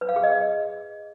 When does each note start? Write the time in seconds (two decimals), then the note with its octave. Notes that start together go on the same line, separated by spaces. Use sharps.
0.01 B4
0.09 F5
0.16 G#4
0.23 D#5